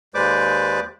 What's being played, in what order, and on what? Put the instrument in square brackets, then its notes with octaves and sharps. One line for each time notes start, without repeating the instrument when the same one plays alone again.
[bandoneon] D#2 G#3 B4 C5 D5 D6